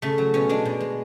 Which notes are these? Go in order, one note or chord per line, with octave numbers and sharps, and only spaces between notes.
C#3 A3
F#3
B2 C#4
G#3 D4
B2
G#3